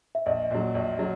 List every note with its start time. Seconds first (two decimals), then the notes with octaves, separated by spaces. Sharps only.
0.15 E5
0.26 A#1 D#5
0.51 A#2 F#3
0.75 A#1
0.99 F#3